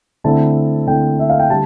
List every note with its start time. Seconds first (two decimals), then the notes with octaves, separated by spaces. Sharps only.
0.24 D3 A3 C4 E4 A5
0.87 D3 A3 C4 E4 G5
1.19 E5
1.30 F5
1.40 G5
1.50 D3 G3 A5